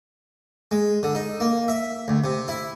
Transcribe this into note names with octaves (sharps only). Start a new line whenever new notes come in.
G#3
D3
D#4
A#3
E5
D2
C3
E4